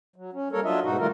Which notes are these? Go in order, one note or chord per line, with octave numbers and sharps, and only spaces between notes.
F#3
C#4
G3 A#3 A4 A#4 C#5
F#3 D4 F4 D#5 E5
G#2 B2 D#4 F#4
D#3 G3 A3 F4 A#4